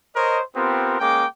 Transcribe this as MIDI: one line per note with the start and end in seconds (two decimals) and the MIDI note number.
0.15 0.40 70
0.15 0.40 72
0.15 0.40 73
0.15 0.40 75
0.56 0.96 59
0.56 0.96 60
0.56 0.96 65
0.56 0.96 67
0.56 0.96 70
0.99 1.25 56
0.99 1.25 58
0.99 1.25 61
0.99 1.25 79
0.99 1.25 86